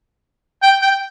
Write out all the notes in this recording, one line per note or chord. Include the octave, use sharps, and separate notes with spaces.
G5
G5